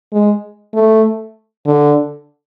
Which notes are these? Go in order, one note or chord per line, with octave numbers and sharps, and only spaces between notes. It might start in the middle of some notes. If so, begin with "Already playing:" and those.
G#3
A3
D3